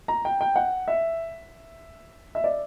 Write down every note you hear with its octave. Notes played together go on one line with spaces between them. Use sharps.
A#5
G5
G5
F#5
E5
E5
D5